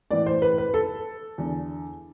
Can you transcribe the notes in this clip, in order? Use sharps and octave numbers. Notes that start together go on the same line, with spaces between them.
A2 E3 D5
C5
B4
B4
A4
E2 D3